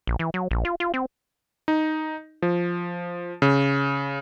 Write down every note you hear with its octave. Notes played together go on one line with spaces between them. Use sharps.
A#1
E3
F#3
A#1
F4
F4
C4
D#4
F3
C#3